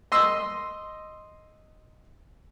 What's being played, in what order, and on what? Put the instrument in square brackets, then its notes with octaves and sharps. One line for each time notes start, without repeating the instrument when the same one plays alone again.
[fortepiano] D#5 C6 E6